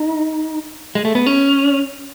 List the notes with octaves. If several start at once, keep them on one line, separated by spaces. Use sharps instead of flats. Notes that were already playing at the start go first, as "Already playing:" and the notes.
Already playing: D#4
G#3
A3
B3
C#4